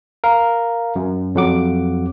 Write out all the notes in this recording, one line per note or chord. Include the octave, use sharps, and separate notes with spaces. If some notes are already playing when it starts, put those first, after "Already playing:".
A#4 F5
F#2
F2 F#3 F#5 D6